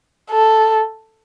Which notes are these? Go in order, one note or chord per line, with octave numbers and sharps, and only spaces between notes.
A4